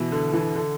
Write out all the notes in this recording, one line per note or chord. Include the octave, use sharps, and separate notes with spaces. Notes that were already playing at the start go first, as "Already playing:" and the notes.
Already playing: B2 E3
D3
E3
D3